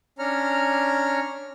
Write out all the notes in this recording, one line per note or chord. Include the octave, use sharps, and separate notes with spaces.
C#4 D4 C#5 A#5 F6